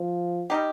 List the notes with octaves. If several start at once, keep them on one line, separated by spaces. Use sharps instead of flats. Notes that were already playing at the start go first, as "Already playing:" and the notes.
Already playing: F3
G3 D#4 G4